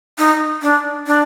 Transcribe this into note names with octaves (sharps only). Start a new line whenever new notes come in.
D#4
D4
D4